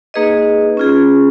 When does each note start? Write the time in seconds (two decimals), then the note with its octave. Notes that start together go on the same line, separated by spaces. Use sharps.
0.14 A#3 D#4 G#4 B4 D#5
0.77 C#4 F4 G#4